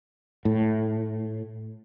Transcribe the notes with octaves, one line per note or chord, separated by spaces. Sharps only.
A2